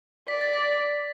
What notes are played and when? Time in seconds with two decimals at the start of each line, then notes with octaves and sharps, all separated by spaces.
0.28 D5 B6
0.41 A6
0.54 B6